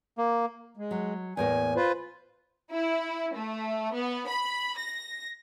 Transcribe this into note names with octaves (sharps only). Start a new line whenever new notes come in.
A#3
G#3
F#3
E2 A2 A#3 G#5
F4 B4 C5
E4
A3
B3
B5
A#6